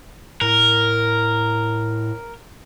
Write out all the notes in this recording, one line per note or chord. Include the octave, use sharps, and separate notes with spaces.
A2 A#4